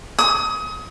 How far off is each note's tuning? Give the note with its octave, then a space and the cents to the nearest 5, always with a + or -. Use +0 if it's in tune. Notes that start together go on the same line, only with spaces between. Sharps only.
D#6 +30